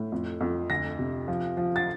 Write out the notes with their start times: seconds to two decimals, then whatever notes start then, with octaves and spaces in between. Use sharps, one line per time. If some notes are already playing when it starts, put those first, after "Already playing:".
Already playing: A2
0.12 F2
0.41 F2
0.70 D2 A#6
0.99 C3
1.28 F3
1.57 F3
1.76 A6